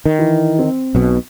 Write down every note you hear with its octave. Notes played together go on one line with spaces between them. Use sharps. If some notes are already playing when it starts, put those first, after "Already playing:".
D#3
E3
C4
B1 B2